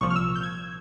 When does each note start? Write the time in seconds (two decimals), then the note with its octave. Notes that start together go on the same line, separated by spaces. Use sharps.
0.01 C2 A#2 F3 C#6
0.10 F6
0.16 E6
0.36 G6
0.43 G#6